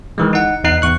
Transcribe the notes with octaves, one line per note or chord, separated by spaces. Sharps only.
D#3 E3 G#3
D#4 F#5
E2 D#4 F#6 C7
E2 C#6 F#6